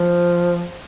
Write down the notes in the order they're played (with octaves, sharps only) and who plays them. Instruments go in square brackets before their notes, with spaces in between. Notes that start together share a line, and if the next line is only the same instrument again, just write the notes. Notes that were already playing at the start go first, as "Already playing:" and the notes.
Already playing: [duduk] F3